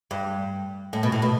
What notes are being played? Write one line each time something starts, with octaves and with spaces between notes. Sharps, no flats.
G2
A2
B2
A2
B2